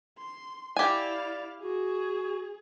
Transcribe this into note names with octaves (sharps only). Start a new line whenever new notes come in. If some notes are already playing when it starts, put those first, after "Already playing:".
C6
E4 G4 D5 F5 G#5
F#4 G#4